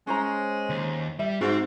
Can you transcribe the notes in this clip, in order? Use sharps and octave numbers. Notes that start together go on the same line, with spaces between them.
G#3 C#4 C5 A#5
D#2
G3 E5
G#2 C4 F#4